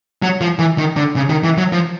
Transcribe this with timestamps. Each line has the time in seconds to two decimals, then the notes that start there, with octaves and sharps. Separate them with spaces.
0.22 F#3
0.41 F3
0.59 E3
0.78 D#3
0.96 D3
1.16 C#3
1.30 D#3
1.44 E3
1.58 F#3
1.72 F3